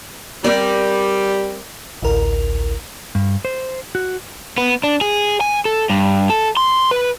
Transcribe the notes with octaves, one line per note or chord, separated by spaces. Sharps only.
G3 C4 A#4 D5
A1 D2 A#4
G2
C5
F#4
B3
D4
G#4
G#5
A4
G2
A4
C6
B4